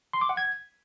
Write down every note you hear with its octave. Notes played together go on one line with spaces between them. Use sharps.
C6
D6
F#5
G#6